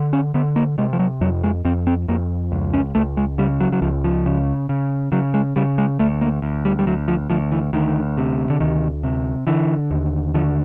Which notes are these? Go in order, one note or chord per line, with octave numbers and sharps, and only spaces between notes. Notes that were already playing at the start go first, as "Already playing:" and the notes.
Already playing: D3
C#4
D3 B3
A#3
C3 G#3
F3
F#3
F2 F#3
G#3
F2 C4
C4
F2 A#3
C#2
C#4
C#2 A3
G#3
C#3 G3
F#3
F#3
C#2 F3
F3
C#3
C#3
C#3 F#3
G#3
C#3 G3
G#3
D2 A3
A#3
D2
G3
G3
D2 F#3
F3
D2 F3
E3
D2 D#3
C3
D3
D2 D#3
C3
D3 E3
D#2
D3 F3